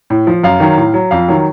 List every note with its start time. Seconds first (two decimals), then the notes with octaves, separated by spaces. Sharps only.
0.10 A2
0.27 F3
0.44 F#2 F5
0.60 D#3 F#3
0.77 A2
0.94 F#3
1.11 F2 F5
1.28 D#3 F#3